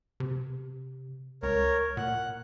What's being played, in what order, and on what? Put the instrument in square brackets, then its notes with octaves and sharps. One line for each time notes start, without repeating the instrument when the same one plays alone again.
[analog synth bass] C3
[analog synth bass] C#2 [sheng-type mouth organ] A#4 C#5
[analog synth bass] A#2 [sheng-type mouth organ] F#5